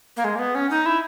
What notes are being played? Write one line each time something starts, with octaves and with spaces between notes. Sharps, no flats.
A#3
G#3
A#3
B3
C#4
D#4
E4